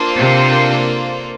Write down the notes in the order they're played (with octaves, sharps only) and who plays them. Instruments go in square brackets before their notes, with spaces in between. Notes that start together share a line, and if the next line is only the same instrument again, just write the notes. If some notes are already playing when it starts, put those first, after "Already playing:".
Already playing: [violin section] A#3 D4 F4 A4 C5
[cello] C3